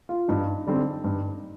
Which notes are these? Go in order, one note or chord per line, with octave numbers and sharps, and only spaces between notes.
F4
G2 D#4
D3 G3 C4
G2